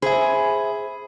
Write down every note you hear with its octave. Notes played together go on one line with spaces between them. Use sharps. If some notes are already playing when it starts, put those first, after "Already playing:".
G#4 C5 E5 G#5 B5